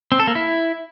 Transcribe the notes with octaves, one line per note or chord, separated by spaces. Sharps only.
C4
A4
A#3
E4